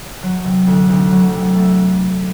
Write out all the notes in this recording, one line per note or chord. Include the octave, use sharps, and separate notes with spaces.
F#3
C3
D2
D2
F#3
C3
A3